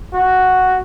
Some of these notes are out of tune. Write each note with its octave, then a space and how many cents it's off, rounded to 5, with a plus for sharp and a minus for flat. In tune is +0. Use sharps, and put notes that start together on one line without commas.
F#4 +0